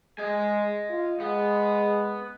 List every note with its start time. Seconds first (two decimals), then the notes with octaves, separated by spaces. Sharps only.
0.18 G#3 D#5 G#5
0.90 F4
1.20 G#3 B3